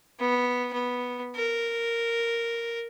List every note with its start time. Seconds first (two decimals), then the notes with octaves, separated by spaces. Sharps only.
0.20 B3
0.73 B3
1.36 A#4